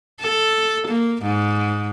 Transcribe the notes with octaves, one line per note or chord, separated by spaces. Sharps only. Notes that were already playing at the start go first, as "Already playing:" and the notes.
A4
A#3
G#2